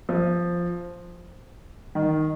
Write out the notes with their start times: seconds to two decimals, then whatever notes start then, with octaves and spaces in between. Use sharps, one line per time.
0.09 F3
1.95 D#3